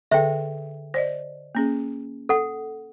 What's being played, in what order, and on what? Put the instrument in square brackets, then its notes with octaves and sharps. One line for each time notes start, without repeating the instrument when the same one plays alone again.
[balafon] D3 G#4 A4 [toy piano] E5 G5
[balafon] C5 D5 D#5
A#3 C#4 G#4
[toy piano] A4 F#5